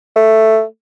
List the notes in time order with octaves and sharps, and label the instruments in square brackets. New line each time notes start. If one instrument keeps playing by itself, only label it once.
[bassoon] A3